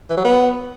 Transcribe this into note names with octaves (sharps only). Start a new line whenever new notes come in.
E3
F#3
B3